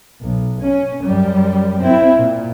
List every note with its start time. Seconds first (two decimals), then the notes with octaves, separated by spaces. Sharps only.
0.21 B1
0.61 C#4
1.03 F#2 G3
1.80 C4 E4
2.17 A#2